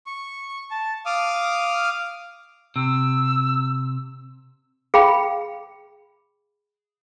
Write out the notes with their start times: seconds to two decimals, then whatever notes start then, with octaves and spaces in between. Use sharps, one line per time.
0.06 C#6
0.71 A5
1.06 F5 D6 D#6 F6
2.76 C3 E6
4.94 G#4 F5 G5 B5